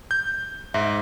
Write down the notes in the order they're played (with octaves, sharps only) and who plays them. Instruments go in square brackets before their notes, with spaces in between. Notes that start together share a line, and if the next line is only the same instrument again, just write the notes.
[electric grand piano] G6
[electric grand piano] G#2 [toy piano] E5